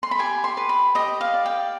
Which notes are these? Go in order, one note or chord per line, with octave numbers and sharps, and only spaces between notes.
C6
B5
G4 G#5
C6
B4
B5
G4 D#5
F5
D5
G5